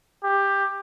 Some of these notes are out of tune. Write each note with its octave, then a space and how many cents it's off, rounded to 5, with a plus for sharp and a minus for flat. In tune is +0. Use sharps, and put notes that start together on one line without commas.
G4 +15